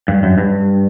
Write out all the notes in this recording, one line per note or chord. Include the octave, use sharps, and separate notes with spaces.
G2
F#2
G2